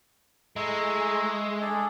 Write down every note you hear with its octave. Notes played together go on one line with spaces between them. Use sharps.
G#3 A3 E4 A#5
D4 G#4 A4